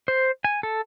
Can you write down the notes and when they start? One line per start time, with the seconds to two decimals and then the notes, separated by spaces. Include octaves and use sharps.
0.08 C5
0.45 G#5
0.63 A4